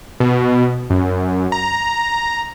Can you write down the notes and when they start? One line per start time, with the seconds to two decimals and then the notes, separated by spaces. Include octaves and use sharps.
0.20 B2
0.90 F#2
1.52 A#5